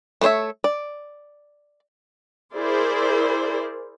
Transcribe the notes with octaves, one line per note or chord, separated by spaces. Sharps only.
A3 B3 C5 C#5 E5
D5
E4 G#4 A#4 C5 D5